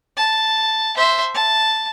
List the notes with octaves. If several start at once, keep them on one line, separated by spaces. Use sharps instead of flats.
A5
C5 E5
A5